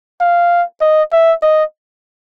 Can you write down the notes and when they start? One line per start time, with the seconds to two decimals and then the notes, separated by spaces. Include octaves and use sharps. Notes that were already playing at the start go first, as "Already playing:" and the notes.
0.20 F5
0.81 D#5
1.12 E5
1.42 D#5